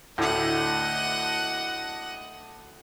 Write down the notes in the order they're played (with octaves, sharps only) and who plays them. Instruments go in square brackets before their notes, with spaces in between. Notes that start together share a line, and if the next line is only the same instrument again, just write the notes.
[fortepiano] D2 A2 [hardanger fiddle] D#5 F#5